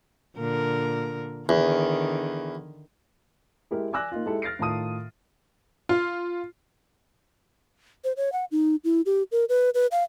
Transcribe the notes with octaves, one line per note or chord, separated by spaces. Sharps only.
A#2 D3 A#4
E2 D3 D#3
G#3 E4 G4 A#4
D5 G#5 D6 E6 F#6 A#6
A#3 D#4 F4
G#3 E4 G4 A4
F6 A6 A#6 C7 D7
A2 D#3 F4 A5 D#6 D#7
F4
C5
C#5
F#5
D#4
E4
G4
A#4
B4
B4
F5